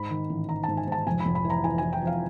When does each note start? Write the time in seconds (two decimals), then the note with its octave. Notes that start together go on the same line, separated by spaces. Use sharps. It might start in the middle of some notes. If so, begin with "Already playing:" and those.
Already playing: G#2 B5
0.11 D#3
0.30 A1
0.49 D#3 A#5
0.64 G#2 A5
0.77 G#5
0.87 G#2 A5
1.07 F1 G#5
1.20 B5
1.25 F1
1.35 B5
1.45 E3
1.50 A#5
1.64 E3 G#5
1.78 E3 G#5
1.93 G5
2.02 F2
2.07 F5